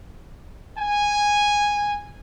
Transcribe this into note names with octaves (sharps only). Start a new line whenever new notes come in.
G#5